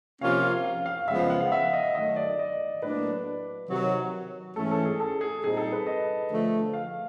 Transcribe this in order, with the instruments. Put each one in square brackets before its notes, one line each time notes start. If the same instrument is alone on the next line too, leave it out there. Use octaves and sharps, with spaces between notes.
[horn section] C3 F3 A#3 C#4 F4 [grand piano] F5
[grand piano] F5
F5
F5
[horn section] F#2 C#3 F3 G#3 B3 [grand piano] E5
[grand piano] F5
F#5
F5
E5
D#5
[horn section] D#3 F#3 A3 [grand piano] D#5
[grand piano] D5
D#5
[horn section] A2 F#3 A#3 D4 [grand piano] B4
[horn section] C3 D#3 F#3
[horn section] G#2 E3 A3 C#4 [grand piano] A4
[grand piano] A4
G#4
A4
G#4
[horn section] A#2 G3 C4 D#4 [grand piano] G#4
[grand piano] A4
B4
D#5
[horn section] D3 F3 A3
[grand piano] F5